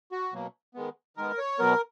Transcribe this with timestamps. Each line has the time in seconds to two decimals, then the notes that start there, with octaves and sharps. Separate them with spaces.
0.12 F#4
0.33 B2 F#3 A#3
0.74 D#3 G#3 B3
1.17 D#3 G#3 B3 A#4
1.38 C#5
1.59 B2 F#3 B3 A#4